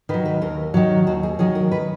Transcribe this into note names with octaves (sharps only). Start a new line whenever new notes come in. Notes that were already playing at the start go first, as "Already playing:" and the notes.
D#3 F#3 B4
B4
D#2 A#4
D#3 F#3
D#2 F#4
G#4
D#3 F#3 G#4
A#4
B4